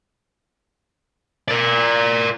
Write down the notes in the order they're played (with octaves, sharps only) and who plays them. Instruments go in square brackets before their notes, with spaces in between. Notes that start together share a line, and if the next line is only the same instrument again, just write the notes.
[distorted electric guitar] A#4 D5